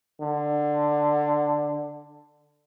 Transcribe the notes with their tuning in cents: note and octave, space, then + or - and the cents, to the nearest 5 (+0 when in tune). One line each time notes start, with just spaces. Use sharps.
D3 +10